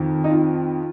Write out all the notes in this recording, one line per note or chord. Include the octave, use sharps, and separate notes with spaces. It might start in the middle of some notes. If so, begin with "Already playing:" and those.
Already playing: F2 D#3
D#4
F4